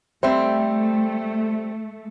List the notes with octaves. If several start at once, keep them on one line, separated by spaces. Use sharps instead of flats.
G3 A3 C4 C5 E5